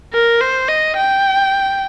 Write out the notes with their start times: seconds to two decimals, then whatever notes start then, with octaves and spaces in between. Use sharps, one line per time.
0.13 A#4
0.41 C5
0.68 D#5
0.96 G5